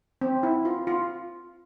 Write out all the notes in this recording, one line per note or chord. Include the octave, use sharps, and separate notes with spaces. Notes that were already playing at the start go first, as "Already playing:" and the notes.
C4
E4
F4
F4